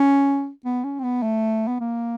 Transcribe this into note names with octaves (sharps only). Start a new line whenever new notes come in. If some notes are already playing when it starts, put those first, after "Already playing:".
Already playing: C#4
B3
C#4
C4
B3
A3
B3
A#3